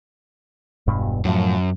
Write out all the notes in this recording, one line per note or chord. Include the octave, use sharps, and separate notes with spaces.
E1 G2 B2
F#2 A2 F3